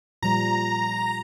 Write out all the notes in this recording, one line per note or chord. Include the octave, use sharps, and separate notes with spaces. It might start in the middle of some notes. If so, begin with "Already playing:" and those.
A#2 F3 G3 A#5